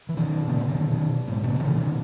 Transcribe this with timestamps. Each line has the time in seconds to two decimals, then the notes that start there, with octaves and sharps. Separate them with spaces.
0.09 E3
0.17 B2 D#3
0.48 A#2 C#3
0.60 C#3
0.69 B2 D#3
0.91 B2 D#3
1.27 G#2 B2
1.43 A#2 C#3
1.59 C#3 E3
1.75 B2 D#3